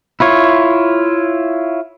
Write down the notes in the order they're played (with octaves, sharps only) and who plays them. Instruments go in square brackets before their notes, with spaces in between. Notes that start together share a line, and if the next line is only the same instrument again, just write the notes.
[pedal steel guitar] E4 F4 C#5